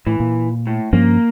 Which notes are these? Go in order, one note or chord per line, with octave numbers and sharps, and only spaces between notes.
A2 E3
A#2
A2
G2 F3 A#3 C#4